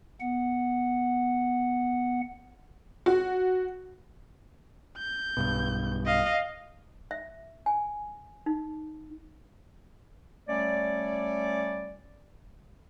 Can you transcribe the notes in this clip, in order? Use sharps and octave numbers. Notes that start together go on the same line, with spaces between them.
B3 F#5
F#4
G6
B1 G2 B2
D#5 F5
E5
G#5
D#4
G3 A3 C#4 C#5 D5